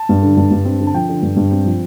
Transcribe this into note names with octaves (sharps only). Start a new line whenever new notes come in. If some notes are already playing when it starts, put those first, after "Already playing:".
Already playing: A5
G2
D3
G2
G2
C4
D3
A5
F3 G5
D3
G2
G2
C4
F3